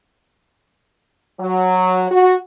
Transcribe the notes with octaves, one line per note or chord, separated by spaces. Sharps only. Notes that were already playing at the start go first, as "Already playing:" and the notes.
F#3
F#4